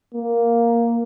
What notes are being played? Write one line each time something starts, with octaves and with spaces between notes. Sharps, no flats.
A#3